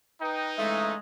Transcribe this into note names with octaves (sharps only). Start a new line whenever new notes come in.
D#4 B4 G5
C#3 E3 G#3 A3 E5